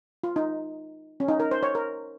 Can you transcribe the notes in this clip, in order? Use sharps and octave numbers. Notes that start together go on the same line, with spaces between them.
F4
D#4
C#4
D#4
A#4
C5
C#5
A#4